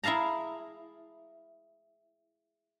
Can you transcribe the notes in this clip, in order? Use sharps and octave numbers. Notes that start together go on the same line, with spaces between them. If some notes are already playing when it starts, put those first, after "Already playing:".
E4 G#4 F5 A5 A#5